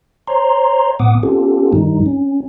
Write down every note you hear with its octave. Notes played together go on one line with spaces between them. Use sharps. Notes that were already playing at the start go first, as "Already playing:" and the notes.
C5 C#5 A#5 C6
A2 B3 F#5 D6 D#6
B3 C#4 F4 G4 A4
G2 D#3 G3 D#4
C#4